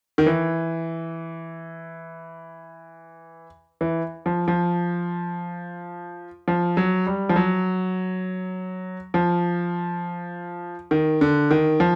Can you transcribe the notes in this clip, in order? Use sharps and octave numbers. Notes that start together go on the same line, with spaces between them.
D#3
E3
E3
F3
F3
F3
F#3
G3
F3
F#3
F3
D#3
D3
D#3
F3